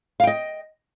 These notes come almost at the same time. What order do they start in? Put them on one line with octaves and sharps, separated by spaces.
F5 G5 D#5